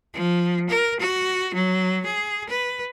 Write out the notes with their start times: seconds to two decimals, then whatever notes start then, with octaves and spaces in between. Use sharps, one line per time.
0.14 F3
0.69 A#4
1.00 F#4
1.54 F#3
2.05 G#4
2.49 B4